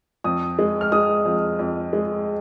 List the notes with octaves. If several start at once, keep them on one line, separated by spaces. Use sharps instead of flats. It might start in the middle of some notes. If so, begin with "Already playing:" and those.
F2 D#6
G#3
F6
G#3 D#6
F2
F2
G#3